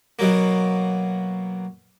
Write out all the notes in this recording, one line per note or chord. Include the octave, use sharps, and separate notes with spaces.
B2 F#3 A#3